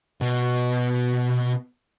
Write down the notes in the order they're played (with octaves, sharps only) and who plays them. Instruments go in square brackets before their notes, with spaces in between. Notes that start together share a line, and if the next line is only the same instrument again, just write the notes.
[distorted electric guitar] B2 B3